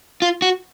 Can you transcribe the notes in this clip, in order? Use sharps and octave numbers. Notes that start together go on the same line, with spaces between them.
F4
F#4